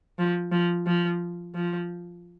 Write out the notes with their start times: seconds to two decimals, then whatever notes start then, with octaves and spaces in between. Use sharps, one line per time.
0.19 F3
0.52 F3
0.87 F3
1.55 F3